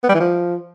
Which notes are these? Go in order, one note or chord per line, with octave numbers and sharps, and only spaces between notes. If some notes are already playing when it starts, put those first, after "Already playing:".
B3
G3
E3
F3